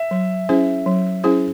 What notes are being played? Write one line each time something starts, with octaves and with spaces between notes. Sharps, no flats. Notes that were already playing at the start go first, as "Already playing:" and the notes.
Already playing: E5
F#3
C#4 E4 G#4 C5
F#3
C#4 E4 G#4 C5